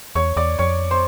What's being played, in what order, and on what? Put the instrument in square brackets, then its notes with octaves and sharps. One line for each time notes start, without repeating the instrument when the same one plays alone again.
[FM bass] E2 [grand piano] C#5 C#6
[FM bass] E2 [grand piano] D5 D6
[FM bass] F2 [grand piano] C#5 C#6
[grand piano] C5 C6